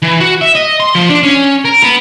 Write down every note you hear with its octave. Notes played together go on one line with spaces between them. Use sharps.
E3
F#4
E5
D#5
C6
F3
D4
C#4
A#4
B3